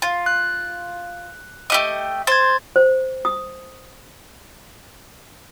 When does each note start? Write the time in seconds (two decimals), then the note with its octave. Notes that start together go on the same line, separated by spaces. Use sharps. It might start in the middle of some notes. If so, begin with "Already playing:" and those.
0.02 F4
0.26 F#6
1.70 A3 G4 D#5
2.27 C5 G#6 A6
2.76 C5
3.25 D#6